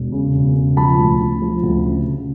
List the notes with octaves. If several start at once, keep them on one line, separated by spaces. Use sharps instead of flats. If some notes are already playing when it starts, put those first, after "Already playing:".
Already playing: E1
C#3
E1
C#3
F3 A5 B5
D2
D2
F3
D2
C#3
C#3